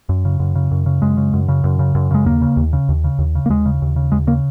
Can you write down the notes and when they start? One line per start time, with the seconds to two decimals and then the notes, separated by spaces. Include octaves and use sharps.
0.09 F#2
0.25 C#3
0.40 F#2
0.55 C#3
0.71 F#2
0.86 C#3
1.02 F#2 G#3
1.17 C#3
1.33 F#2
1.48 C#3
1.64 F#2
1.79 C#3
1.95 F#2
2.11 C#3 G#3
2.26 D#2 A#3
2.41 C#3
2.57 D#2
2.73 C#3
2.89 D#2
3.04 C#3
3.19 D#2
3.35 C#3
3.46 A#3
3.50 D#2 G#3
3.66 C#3
3.82 D#2
3.96 C#3
4.12 D#2 G#3
4.27 C#3 A#3